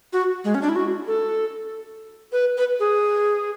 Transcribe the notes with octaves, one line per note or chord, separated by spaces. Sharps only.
F#4
G#3
C#4
D4
E4
F#4
A4
B4
B4
G#4